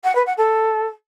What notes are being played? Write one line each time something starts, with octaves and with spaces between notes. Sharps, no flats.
F#5
B4
F#5
A4